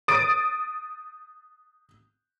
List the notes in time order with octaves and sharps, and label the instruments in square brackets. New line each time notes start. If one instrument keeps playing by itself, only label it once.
[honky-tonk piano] D#6 A6 D7